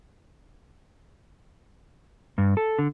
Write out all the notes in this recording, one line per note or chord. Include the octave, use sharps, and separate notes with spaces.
G2
A4
D3